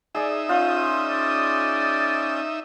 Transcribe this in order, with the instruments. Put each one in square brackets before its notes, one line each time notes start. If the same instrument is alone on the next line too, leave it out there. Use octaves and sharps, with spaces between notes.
[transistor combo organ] D#4 E5 [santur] G#4 D5
[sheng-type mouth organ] C#4 D#6 G6 [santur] F4
[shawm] D5